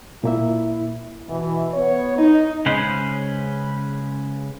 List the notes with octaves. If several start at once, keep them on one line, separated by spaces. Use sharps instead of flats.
A#2 A#3 E4 E5
B2 E3
B3 C#5
D#4
C#3 G#3 C#4 B4 C5